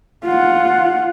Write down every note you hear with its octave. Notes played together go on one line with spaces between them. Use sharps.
F4 F#5